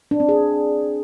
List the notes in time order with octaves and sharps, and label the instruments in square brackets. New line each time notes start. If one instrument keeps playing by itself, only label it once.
[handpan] D4
C4
G#4